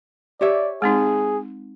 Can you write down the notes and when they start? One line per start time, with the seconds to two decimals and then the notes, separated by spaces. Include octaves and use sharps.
0.41 G4 C#5 D5 E5
0.82 G#3 C4 D#4 G#4